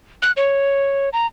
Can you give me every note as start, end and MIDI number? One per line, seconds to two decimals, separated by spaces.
0.22 0.32 90
0.37 1.09 73
1.13 1.26 82